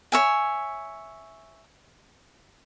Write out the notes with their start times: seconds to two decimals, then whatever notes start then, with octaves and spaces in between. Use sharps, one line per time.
0.12 C#5 E5 G#5